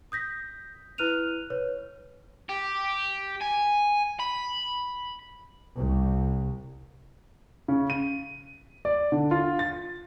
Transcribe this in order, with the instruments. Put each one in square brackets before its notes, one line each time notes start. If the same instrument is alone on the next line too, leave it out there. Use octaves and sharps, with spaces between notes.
[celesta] D#6 G6 A#6 B6
E4 B4 F6 F#6 D#7 F7
B4 C#5
[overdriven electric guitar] G4
G#5
B5
[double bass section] C2
[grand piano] C#3
D#7
D5
D3
F4
A6